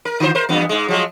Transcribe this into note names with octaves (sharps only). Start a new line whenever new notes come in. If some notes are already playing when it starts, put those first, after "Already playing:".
A#4
D3 F4 C5
A#4 C5
E2 G2 B3
G#2 G#3
F3 F#3 G#3